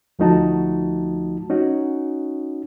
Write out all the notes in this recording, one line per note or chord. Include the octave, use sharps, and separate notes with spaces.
D2 F3 A3 D#4 F#4 A5
C#4 D#4 F#4